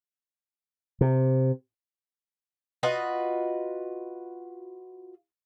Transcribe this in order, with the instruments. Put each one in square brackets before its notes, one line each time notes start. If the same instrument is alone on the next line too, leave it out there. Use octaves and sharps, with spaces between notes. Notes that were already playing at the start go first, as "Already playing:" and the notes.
[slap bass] C3
[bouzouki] F4 F#4 B4 D#5